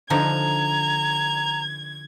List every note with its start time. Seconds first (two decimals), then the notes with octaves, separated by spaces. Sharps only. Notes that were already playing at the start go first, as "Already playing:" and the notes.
0.10 D3 F3 D#4 A#5 G#6